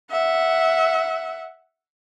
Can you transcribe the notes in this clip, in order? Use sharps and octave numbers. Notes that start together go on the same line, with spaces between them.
E5 F#5